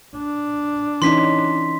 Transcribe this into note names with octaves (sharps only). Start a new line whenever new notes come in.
D4
E3 C#4 D#4 C6 B6